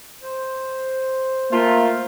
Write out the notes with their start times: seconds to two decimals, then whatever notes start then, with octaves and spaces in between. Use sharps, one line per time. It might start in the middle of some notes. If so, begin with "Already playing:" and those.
0.23 C5
1.52 A3 A#3 F4